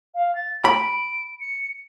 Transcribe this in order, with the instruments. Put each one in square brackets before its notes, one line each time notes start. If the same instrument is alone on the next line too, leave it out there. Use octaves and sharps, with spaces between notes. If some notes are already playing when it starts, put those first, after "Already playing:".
[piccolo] F5
A6
[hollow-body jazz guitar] B5 [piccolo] D7
[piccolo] C#7